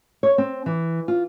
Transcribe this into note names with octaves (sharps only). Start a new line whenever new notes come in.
C#5
C4
E3
F4